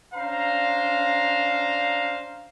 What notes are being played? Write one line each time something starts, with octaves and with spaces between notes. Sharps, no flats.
C#4 D4 C5 F5 A#5